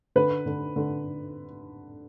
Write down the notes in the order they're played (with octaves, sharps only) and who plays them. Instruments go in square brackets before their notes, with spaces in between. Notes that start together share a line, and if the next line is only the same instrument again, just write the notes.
[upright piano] D3 B4
D3
D3